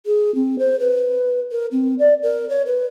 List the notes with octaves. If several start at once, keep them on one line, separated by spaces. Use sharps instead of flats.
G#4
C4
C5
B4
A#4
C4
D5
A#4
C#5
B4